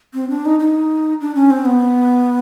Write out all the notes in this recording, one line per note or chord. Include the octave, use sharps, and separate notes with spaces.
C4
D4
D#4
D#4
D4
C#4
C4
B3